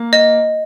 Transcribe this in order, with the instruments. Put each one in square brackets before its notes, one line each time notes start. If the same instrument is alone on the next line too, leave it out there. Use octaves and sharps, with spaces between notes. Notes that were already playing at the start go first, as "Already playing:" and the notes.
Already playing: [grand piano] A#3
[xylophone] D#5